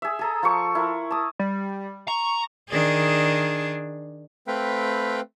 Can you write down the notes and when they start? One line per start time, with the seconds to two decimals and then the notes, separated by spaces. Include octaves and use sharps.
0.02 G#4 E5
0.19 G#4 A4 A#5
0.43 F3 A4 C#6
0.75 E4 A#4
1.11 A5 D#6
1.39 G3
2.08 A#5 C#6
2.70 D#3 D4 G#4
4.47 A3 C4 B4 F5 G5 B5